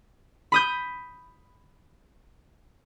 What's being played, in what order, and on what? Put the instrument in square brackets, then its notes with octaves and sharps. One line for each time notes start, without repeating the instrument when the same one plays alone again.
[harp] B5 D#6 G6